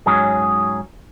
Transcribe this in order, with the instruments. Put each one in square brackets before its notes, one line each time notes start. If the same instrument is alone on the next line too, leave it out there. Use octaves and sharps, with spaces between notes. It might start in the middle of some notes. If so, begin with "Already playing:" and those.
[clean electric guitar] G#2 F#3 C#4 G#4